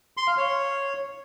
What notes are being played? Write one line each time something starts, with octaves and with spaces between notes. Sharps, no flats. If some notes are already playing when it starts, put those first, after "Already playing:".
C6
F5
C#5